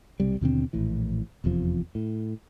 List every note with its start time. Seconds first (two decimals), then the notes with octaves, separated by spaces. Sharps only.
0.20 B1 C3 G3
0.41 D#2 B2 D3 C4
0.73 A#1 A2 E3
1.44 F1 E2 C3 F3
1.95 A2